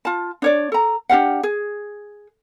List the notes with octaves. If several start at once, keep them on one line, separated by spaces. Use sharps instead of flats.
F4 A5
D4 C#5 D5
A4 A#5
D4 G4 F5 F#5
G#4